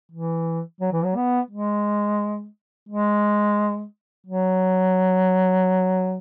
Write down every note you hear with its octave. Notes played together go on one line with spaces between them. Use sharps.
E3
F#3
E3
F#3
B3
G#3
G#3
F#3